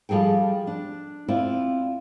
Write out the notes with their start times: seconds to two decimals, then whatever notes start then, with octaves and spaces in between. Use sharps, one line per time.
0.09 F3 G3 G#4 A4 G5
0.67 D4
1.28 C4 E4 F4 D5